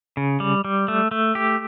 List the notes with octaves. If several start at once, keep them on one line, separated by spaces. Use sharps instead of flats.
C#3
G3
G3
A3
A3
G4